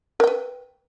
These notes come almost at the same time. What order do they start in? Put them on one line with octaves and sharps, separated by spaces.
A#4 G5 B4